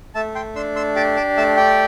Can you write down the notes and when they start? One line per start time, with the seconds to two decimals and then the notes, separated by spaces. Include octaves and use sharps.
0.15 A3 E5 A5
0.35 G5 C6
0.55 D4 C6 E6
0.75 C6 E6
0.96 G4 A5 D6
1.16 A5 D6
1.37 A3 E5 A5
1.57 D5 G5